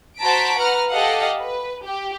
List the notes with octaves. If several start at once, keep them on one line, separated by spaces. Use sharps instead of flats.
F#4 C5 A5 A#5 B6 D7
B4 F#5 A#5 F6
G4 A4 D#5 F5 F#5
B4
G4